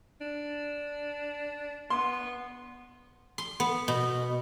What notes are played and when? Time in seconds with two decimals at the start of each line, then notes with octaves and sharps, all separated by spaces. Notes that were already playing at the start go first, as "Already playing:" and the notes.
0.21 D4
1.90 B3 C6
3.38 C6
3.60 B3
3.88 B2